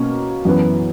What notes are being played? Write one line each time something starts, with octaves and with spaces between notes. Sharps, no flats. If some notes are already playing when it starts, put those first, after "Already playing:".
Already playing: B2 A#3 C#4
F#2 E3 B3